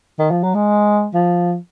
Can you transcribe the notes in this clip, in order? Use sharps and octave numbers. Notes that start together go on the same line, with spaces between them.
D#3
F3
F#3
G#3
F3